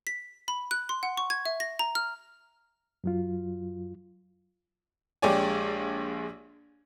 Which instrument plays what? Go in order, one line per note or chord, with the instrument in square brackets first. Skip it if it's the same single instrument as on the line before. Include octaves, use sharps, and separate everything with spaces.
[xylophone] B6
B5
F#6
C6
F#5
C#6
G#6
E5
A#6
A#5
F6
[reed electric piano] F#2 F#3 F4
[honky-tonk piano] A#1 G#3 G4 C#5 D5 G#5